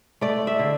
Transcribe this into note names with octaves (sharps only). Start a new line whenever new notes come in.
A3 D5
E5
D3